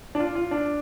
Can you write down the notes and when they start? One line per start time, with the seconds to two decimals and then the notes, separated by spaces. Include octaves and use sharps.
0.15 D4
0.19 F4
0.35 F4
0.51 D4